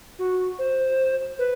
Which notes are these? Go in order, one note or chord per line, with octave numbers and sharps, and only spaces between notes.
F#4
C5
B4